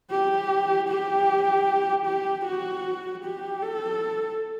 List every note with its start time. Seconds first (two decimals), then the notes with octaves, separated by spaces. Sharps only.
0.11 G4
0.89 G4
2.06 G4
2.45 F#4
3.24 G4
3.63 A4